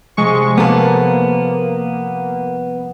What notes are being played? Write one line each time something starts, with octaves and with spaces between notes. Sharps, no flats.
C3 F3 G3 G#3 C#6
A#3 B3 A4